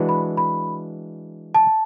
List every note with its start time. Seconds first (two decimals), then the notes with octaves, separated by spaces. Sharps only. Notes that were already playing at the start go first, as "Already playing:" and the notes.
Already playing: E3 G#3 D4 F#4 B4
0.09 B5
0.37 B5
1.55 A5